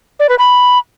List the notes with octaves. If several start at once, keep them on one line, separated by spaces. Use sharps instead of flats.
D5
B4
B5